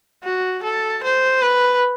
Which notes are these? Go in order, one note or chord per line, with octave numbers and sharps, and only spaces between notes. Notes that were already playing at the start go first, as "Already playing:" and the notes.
F#4
A4
C5
B4